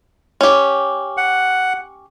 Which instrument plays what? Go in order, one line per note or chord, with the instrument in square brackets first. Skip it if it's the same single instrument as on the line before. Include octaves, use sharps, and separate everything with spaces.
[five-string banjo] C#4 G4
[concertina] F#5